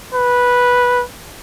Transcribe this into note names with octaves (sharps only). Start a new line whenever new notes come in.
B4